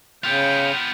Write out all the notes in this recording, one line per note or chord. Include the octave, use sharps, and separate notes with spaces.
C#3 B3 F4 G5